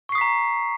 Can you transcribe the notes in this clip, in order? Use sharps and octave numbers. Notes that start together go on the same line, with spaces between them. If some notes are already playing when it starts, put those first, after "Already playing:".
A#5 C#6 D#6 B6 C7